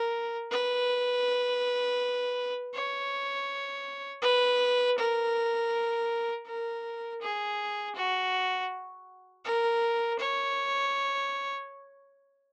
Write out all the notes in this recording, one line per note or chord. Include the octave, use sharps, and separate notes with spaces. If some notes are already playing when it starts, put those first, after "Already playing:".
Already playing: A#4
B4
C#5
B4
A#4
A#4
G#4
F#4
A#4
C#5